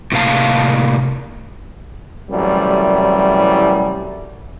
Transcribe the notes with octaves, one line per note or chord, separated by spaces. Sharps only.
A2 C3 A#3 F5 A5
C2 F#2 A2 E3 G3